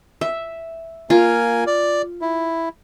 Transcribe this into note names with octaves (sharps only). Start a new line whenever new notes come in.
E5
A#3 F4 G#5
D5
E4